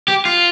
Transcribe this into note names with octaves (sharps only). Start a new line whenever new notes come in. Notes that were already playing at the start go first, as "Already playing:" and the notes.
G4
F4